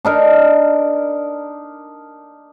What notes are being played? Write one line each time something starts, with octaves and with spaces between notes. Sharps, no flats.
D4 D#4 A#4